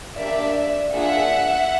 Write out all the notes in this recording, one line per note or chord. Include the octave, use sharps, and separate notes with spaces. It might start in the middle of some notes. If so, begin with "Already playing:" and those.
A#3 D4 G4 D5 E5
A#3 D4 F4 G#4 E5 F#5